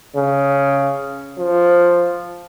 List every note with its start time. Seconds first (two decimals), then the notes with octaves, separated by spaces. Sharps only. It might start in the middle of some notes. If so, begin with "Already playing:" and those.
0.16 C#3
1.38 F3